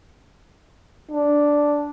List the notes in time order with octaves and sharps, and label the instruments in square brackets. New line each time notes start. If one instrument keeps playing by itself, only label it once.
[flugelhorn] D4